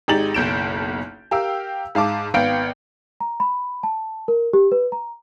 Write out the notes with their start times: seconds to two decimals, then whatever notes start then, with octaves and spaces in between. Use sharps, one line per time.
0.08 G#1 G#3 D#4 G4 A6 F#7
0.34 F#1 B1 G6 D7 E7
1.31 G4 A#4 F5 G5 E6
1.95 G#2 F5 A5 D6
2.34 G#1 B3 F5 G5 G6 D7
3.20 A#5
3.40 B5
3.83 A5
4.28 A#4
4.53 G4
4.72 B4
4.92 A#5